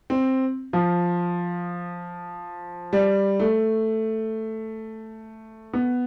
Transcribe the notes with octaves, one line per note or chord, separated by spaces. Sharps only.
C4
F3
G3
A3
B3